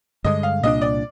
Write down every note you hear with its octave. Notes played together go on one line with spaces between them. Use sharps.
G2 D3 G#3 D#5
F5
C2 A#2 G3 D4 D#5
D5